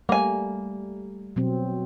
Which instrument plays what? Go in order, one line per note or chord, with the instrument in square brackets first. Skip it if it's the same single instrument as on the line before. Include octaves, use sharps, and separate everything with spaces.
[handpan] G3 A3 [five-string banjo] A#3 G#5
[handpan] B2 F#3 C4